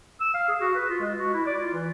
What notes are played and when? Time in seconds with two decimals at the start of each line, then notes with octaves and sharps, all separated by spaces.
0.21 E6
0.34 F5
0.48 G#4
0.61 F#4
0.75 B4
0.89 F4
1.00 G#3
1.18 F#4
1.34 E4
1.46 D5
1.60 F4
1.74 E3